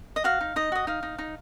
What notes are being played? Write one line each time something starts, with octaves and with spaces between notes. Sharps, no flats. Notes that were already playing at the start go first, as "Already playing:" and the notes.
D#5
F#4 F5
D#4
D#4 D#5
F#4 D#5
D#4 F5
D#4
D#4